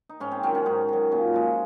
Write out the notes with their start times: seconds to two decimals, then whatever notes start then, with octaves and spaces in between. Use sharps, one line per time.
0.09 D#4
0.20 G#2 C#4
0.32 C4
0.43 D#3 F#3 C#4
0.55 C#4
0.66 G#2 D#4
0.88 D#3 F#3
1.11 A#2 C#4
1.34 F3 G#3